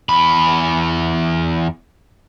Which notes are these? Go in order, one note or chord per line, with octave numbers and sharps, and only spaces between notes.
E2 B5